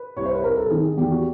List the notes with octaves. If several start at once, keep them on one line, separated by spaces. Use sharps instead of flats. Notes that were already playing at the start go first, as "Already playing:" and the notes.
Already playing: B4
C2 C#5
C5
B4
C2 A#4
A4
D#3 G#4
G#4
E2 G4
F#4